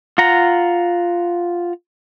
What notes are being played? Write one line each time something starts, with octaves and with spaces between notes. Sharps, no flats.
F4 F#5 A#5